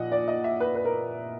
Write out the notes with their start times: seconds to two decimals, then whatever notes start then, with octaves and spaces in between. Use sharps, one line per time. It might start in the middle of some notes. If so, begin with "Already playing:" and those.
Already playing: A#2 F3 D#5 F#5
0.12 D5
0.28 D#5
0.44 E5
0.60 B4
0.75 B4
0.85 A#4